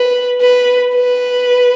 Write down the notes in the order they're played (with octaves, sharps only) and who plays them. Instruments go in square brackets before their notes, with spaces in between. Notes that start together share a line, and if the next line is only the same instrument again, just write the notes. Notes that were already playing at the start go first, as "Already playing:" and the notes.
Already playing: [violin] B4
B4
B4